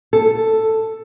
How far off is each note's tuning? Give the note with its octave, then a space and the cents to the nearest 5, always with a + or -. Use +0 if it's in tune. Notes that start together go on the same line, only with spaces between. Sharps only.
A4 +5